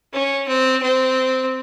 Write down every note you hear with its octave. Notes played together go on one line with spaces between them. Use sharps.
C#4
C4
C4